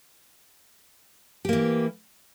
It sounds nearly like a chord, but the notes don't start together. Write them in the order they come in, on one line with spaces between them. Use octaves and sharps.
G4 A#3 E3